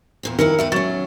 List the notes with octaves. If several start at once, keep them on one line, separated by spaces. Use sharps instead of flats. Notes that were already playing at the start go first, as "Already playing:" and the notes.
E2 A#2 C4
F2 D#3 E3 E4 A#4 C#7
E2 G3 B4 E5
F#3 C#4 C#6 A6 E7